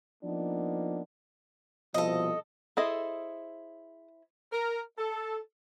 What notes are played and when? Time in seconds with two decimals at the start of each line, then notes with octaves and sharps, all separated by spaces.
0.23 F3 A#3 B3 D4 D#4
1.94 C2 B2 F3 A4 D#5
2.77 E4 G#4 A4 C5 D#5
4.52 A#4
4.98 A4